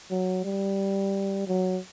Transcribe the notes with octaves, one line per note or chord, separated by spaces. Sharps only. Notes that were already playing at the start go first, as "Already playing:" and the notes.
F#3
G3
F#3